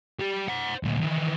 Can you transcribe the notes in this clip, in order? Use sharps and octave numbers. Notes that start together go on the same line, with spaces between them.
G3 G4
C5 F#5
D2 A#2
D#3 E3